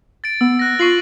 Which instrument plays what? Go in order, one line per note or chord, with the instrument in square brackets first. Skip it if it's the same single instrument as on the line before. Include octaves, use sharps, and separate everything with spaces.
[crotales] A6 D7
[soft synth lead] B3 [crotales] E6
[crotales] F#6 A#6
[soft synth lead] F4 [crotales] C#6 C7 F#7